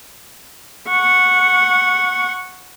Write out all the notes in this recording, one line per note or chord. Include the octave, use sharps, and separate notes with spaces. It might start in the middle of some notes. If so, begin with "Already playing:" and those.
F#5 C#6